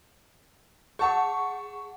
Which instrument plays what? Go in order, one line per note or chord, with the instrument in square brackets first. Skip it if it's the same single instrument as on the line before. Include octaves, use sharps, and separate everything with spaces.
[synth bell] G#4 F#5 [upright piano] A5 C#6